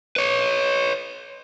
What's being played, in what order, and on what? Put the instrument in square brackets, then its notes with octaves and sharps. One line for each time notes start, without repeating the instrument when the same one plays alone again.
[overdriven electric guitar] B4 C#5